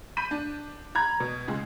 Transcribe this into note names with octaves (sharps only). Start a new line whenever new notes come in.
B5 G6 B6 D#7
D4
A#5 B5 G#6
B2
C#2 G#3